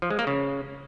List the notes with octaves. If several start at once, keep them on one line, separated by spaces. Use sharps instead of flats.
F3
G#3
A#3
C#3